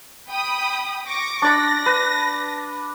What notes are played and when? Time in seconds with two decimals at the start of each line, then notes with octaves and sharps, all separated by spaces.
0.27 G5 B5 D#6
1.07 C#6 D6 A#6
1.42 D4 D5 B5 A#6
1.86 B4